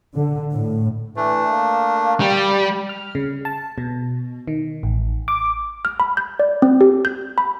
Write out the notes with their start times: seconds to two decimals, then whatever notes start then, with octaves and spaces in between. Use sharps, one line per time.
0.15 D3
0.52 A2
1.17 E3 A3 D4
1.51 A#3
2.20 G3
2.89 F6
3.15 C#3
3.45 A5
3.78 B2
4.48 D#3
4.83 A1
5.28 D6
5.85 F6
6.00 B5
6.17 G6
6.40 D5
6.62 C4
6.81 G4
7.05 G6
7.38 B5